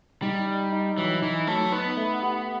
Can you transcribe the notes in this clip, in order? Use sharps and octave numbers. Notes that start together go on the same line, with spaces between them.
G3 D#4
D#4
D#4
E3 F#3
E3 D#4
F#3 A3
B3 D#4
A3
G4